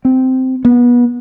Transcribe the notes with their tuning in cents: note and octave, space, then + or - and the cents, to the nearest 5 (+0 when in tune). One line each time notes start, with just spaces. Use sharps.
C4 -10
B3 -25